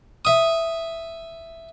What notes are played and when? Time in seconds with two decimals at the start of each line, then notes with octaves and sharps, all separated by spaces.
0.25 E5 D#6